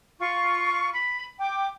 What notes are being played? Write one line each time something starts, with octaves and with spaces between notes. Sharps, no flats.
F4 C#6
B5
G5 D6